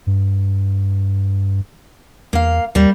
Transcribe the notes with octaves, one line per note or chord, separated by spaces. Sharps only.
G2
E2 A#3 F5
D#2 G3 A#3